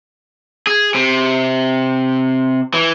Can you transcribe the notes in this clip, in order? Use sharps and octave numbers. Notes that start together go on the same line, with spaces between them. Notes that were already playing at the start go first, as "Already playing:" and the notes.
G#4
C3
E3